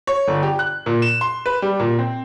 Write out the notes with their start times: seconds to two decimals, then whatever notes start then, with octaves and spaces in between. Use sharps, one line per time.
0.07 C#5
0.28 G1
0.43 G4
0.59 F#6
0.86 A#2
1.02 E7
1.21 C6
1.46 B4
1.62 G3
1.80 A#2
1.99 C4